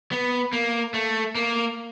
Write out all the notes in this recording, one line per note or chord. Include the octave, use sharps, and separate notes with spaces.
B3
A#3
A3
A#3